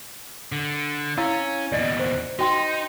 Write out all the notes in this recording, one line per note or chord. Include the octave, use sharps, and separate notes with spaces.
D3
C#4 E4 F5 E6
D#2 B2 D5 D#5
C5
D#4 F#4 G5 C6